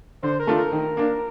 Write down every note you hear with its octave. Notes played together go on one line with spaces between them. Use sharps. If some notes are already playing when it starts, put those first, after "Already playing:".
D3 C5
A#4
A3 D4 F4
A#4
D#3
A#3 D4